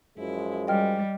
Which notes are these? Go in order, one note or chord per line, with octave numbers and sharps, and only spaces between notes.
F#2 F3 G#3 E4
G3 D#5 G5 F6